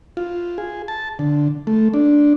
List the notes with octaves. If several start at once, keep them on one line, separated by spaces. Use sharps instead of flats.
F4
G#4
A5
D3
A3
D4